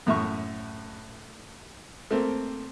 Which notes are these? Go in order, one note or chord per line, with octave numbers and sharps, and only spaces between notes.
F#2 A2 E5 C#6
A3 A#3 C4